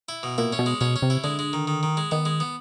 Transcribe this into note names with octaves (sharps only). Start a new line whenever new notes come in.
E4
B2
A#2 E4
C#4
B2
G#3
B2 C#4
C#4
C3
E4
D3 G#3
G#3
D#3
D#3
D#3
G#3
D#3 B3
G#3
B3